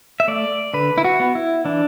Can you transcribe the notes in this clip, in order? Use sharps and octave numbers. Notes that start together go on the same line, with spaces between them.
E5
A3 D5
D3 B4
E4
F#4
B3
E4
E3 D4